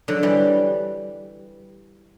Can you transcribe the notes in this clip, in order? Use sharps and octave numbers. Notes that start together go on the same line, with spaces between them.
D3 F#3
E3 G3